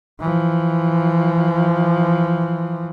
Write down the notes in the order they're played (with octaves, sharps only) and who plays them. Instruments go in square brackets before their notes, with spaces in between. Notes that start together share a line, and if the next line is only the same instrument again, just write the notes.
[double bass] E3 F3